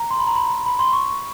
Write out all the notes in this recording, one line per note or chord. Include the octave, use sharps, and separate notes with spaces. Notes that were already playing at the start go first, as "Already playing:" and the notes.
Already playing: A#5
C6
B5
A#5
B5
B5
C6
C#6